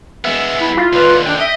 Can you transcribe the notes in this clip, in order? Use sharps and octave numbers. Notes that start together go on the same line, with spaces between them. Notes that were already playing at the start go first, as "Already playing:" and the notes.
G#3 B3 E5
E4
F4
D#2 D3 B4
D4 G5
D#5 E5